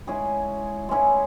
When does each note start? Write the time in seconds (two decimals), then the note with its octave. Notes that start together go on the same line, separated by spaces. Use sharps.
0.07 G#3 C#4 E4 G#4
0.89 G#3 C#4 E4 G#4